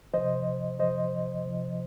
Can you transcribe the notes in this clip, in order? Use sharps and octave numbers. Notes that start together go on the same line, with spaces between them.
C3 F3 C5 D#5
C3 F3 C5 D#5
C3 F3